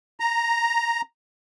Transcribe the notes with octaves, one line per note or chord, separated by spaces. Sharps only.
A#5